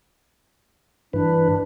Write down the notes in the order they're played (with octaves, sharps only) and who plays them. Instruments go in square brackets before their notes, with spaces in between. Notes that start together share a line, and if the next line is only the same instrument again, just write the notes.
[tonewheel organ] G2 E3 B4 [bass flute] D4